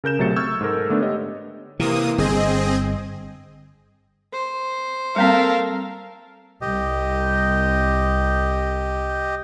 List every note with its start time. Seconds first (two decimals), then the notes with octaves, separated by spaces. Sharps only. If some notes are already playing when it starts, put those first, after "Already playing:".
0.04 C#3 A#4 G6 E7
0.19 B1 C3 F#3 A3 A6 C#7
0.36 C#6 E6 F6 G6 G#6
0.61 G#2 A4 A#4
0.89 D3 A3 B3 D4
1.01 G4 C#5 D#5
1.80 C3 E3 A#3 D#6
2.18 G1 C4 G#4 D#5
4.33 C5
5.16 G3 A#3 C4 A4 A#4 F5
6.61 C2 G4 D#5